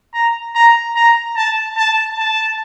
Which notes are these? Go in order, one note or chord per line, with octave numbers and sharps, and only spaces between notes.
A#5
A#5
A#5
A5
A5
A5